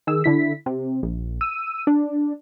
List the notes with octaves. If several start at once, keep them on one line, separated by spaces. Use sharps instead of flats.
D#3 G#4 E6
D3 E4 B6
C3
A#1
E6 D#7
D4